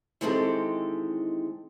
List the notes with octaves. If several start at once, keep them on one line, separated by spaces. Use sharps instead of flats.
D#3 E3 G#3 C4 G4 A4